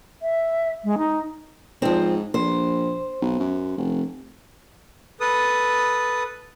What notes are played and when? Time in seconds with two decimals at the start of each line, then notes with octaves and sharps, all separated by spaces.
0.22 E5
0.84 G#3
0.97 D#4
1.82 G#2 F3 C4
2.34 A#1 C5
3.22 B1
3.40 F#2
3.77 F1
5.20 A4 B4 D#6